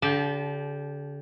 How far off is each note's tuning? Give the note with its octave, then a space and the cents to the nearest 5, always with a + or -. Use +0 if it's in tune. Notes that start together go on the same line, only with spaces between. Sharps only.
D3 -40 G4 +0 A5 -25